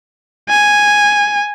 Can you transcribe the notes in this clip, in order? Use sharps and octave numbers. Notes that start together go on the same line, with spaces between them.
G#5